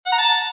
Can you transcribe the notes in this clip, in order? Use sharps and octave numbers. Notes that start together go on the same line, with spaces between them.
F#5
A#5
A5